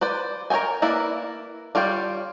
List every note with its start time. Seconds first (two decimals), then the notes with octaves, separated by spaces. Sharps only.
0.01 B4 C5 D5
0.50 A#4 C#5 D#5 G5 G#5
0.82 A#3 E4 B4 D5
1.75 G3 F4 C#5 D5 G5